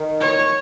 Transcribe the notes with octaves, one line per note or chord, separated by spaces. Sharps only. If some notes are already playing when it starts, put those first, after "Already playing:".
Already playing: D#3
C#5